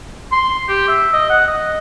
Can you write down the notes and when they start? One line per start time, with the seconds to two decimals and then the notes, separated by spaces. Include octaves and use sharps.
0.32 C6
0.69 G4
0.88 E5
1.13 D#5
1.30 F#5
1.47 D#5